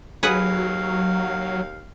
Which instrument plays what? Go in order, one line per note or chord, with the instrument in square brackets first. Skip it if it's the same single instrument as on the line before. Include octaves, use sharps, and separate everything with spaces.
[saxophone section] D#2 F5 [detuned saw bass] F#3 [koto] G#4 B4 F#5